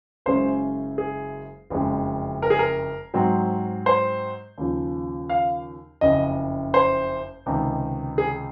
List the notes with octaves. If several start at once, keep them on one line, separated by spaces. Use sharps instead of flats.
F#1 F#2 C#3 G#3 C#4 C5
G#4
F#1 F2 C#3 G#3
A#4
G#4
A#4
G#2 F#3 C4
C5
D#2 C#3 F3
F5
F#1 F2 C#3 D#5
C5
C#2 C3 D#3
G#4